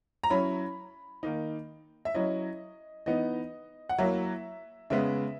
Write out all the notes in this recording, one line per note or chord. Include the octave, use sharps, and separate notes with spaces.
A#5
F#3 C#4 E4 B5
D#3 A#3 D#4
E5
F#3 C#4 E4 D#5
E3 B3 D#4 D#5
F#5
F#3 A#3 E4 E5
C#3 G#3 B3 E5